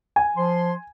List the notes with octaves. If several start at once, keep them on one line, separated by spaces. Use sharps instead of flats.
G#5
F3 C6